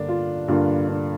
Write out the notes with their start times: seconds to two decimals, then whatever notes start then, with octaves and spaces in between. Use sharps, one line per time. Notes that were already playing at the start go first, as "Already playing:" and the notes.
Already playing: G2 D3 A#3 D4
0.09 F4
0.48 G2 D3 A#3 F4
0.88 D4